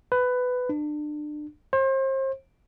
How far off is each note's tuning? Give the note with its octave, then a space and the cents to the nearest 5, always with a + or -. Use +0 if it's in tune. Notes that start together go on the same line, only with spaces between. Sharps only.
B4 +15
D4 +30
C5 +35